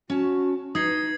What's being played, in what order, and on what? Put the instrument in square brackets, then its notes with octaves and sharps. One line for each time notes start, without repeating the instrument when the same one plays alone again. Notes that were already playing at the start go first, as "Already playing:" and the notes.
[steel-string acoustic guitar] C#4 A5 [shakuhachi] F#4
[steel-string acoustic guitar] D#4 [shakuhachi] B4 [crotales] D#6 G#6 C7